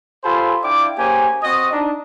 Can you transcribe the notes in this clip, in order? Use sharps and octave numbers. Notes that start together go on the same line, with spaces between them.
F4 G4 A4 C5 G#5 B5
D4 E4 D5 F5 G5 D6
A#3 C#4 G4 G#4 C5 G#5
C4 F#4 D#5 D#6
D4 D#4